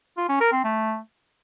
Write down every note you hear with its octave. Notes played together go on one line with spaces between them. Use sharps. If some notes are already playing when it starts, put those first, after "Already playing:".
F4
C#4
A#4
C4
A3